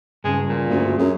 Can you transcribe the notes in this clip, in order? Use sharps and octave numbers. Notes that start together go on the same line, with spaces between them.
G2 C#3 G#3
A#2
D2 A#3 C#4 G#4
F#2 G#4